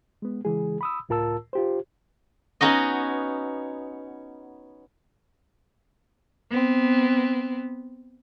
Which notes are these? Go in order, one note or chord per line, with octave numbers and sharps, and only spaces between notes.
G#3 B3
C#3 E3 G#3 G#4
B5 D#6 E6
C#2 A2 F4 A#4 A5 E6
F4 G4 C5
B3 C#4 D#4 F#4 D#5
B3 C4